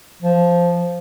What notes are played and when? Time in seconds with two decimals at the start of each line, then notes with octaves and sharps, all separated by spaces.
0.22 F3